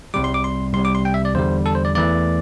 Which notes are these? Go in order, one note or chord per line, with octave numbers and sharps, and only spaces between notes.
C2 C3 G3 D6
C6
D6
C6
C2 C3 G3 C6
D6
C6
G5
E5
D5
E2 D3 G3 C5
A4
C5
D5
E2 E3 A3 D5